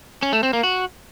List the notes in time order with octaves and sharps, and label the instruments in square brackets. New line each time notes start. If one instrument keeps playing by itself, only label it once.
[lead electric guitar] C#4
A3
C4
A#3
F#4